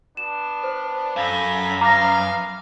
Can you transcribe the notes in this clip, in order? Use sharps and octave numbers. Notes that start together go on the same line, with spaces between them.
B3 D4 E7
C5
F#2 A4 F5 A#5 B5
B3 F5 A#5 D6 A#6